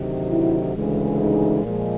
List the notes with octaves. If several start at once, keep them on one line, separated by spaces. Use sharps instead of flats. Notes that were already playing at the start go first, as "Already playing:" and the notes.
Already playing: D2 C3 D#3 F#3
E4
D2 C#3 E3 G#3
D#4
A#2 F3 G#3